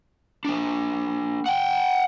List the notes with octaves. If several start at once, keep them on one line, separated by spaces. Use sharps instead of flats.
A#3 D4
F#5 G5